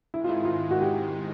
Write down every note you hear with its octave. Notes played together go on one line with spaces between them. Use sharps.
G#2 D#3 G#3 E4
F4
E4
F4
F#4
G4